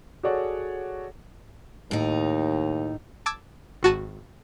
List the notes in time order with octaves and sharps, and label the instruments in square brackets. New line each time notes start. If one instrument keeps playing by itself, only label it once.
[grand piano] F#4 G#4 A4 C#5 D5 F#5
[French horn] D#2 [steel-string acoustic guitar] A2 D#4
[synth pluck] A5 D6 E6 G#6
G#1 F#4 A5 D#7